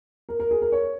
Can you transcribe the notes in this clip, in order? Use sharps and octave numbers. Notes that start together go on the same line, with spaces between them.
A#4
A#4
G#4
A#4
C#5